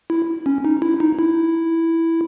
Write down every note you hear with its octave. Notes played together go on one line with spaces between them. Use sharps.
E4
C#4
D#4
E4
D#4
E4